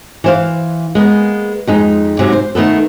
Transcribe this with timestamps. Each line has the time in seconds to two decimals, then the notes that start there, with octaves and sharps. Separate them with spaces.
0.24 E3 C5 F5
0.95 G#3 A#3 B3
1.67 F2 G#3 D#4
2.19 G#2 C3 F#3
2.32 C5
2.55 D#3 A3 B3 A4